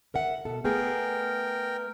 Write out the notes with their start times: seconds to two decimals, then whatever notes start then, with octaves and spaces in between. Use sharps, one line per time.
0.14 A#4 E5 F#5
0.45 B2 A4
0.64 A3 B3 G#4 A#4 G5